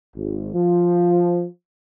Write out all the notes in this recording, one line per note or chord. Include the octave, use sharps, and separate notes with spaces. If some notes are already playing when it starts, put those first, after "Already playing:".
G#1
F3